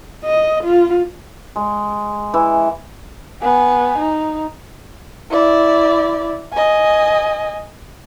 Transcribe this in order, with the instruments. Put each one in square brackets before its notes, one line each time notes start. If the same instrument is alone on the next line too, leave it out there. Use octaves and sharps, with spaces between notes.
[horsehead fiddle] D#5
F4
[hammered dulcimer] G#3
E3
[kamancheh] B3 G#5
D#4
E4 D5
D#5 G#5